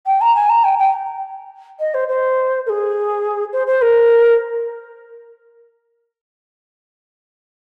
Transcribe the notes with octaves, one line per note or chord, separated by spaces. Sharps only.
G5
A#5
G#5
A#5
G5
G5
D#5
C5
C5
A#4
G#4
C5
C5
A#4